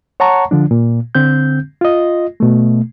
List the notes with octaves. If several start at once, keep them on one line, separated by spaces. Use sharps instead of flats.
C#5 F#5 A5 A#5 C#6
D3 F3 D4
A#2
D3 C4 G6
F4 D#5
B2 A3